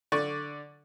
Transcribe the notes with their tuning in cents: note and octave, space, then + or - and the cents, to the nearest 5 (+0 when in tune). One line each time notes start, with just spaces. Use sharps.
D3 +0 D5 +0 C#6 +0